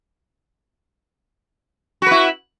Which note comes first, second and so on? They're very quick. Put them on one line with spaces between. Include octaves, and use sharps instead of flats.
F#4 B4 E4